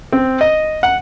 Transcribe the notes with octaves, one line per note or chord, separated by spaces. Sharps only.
C4
D#5
F#5